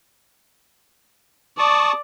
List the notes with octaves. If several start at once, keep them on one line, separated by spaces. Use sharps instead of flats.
D5 A5 C#6 D#6